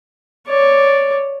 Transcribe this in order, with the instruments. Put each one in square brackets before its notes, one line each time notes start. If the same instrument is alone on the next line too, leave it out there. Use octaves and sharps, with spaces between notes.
[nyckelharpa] C#5 D5